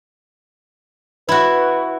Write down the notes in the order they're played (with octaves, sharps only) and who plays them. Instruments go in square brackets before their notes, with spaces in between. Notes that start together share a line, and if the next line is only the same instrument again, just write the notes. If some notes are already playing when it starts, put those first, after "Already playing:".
[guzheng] E4 F#4 [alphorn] B4